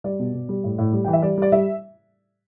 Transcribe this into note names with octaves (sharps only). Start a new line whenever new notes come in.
G3 D5
B2
B2
G3
A2
A2
G3
E3 G5
E5
G3 D5
G3 D5
G3 E5